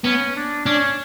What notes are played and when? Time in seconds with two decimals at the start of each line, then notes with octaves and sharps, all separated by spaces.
0.04 B3 C#4
0.36 D4
0.65 C#4 D4